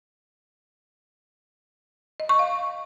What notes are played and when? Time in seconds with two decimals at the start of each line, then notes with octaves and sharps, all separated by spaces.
2.20 D#5
2.29 C#6
2.39 F5